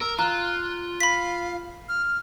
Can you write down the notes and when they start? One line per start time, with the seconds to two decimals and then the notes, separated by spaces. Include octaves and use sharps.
0.01 A#4 E6
0.19 F4 A#5 F#6
1.01 F5 B5 B6
1.89 F6